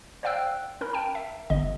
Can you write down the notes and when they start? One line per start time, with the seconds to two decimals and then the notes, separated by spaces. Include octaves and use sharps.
0.23 C5 D5 F5 G5 E6 F#6
0.81 C#4 A#4 B5
0.93 G5 A5 A#5
1.15 E5
1.50 G1 D3 D#5